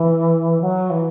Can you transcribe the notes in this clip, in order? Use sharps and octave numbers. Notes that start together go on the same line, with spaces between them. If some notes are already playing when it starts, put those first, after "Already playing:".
Already playing: E3
F#3
E3